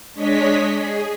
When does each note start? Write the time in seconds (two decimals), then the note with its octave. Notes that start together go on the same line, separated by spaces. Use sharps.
0.14 G#3 D4 C#5 D#5 B6
0.70 G#4